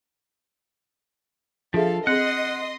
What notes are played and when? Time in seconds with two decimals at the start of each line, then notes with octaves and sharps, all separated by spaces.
1.74 F3 D4 G#4 A4 E5 F5
2.07 C4 G#4 D#5 F#5 C6 D#6